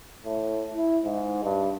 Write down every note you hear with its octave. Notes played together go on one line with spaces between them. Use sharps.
A2
E4
G#2
G2